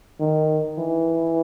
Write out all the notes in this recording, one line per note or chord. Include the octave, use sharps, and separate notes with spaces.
D#3
E3